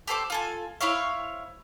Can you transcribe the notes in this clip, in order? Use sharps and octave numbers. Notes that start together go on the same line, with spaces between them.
G4 A4 C5 D6
F4 A4 G#5
E4 C5 C#5 F5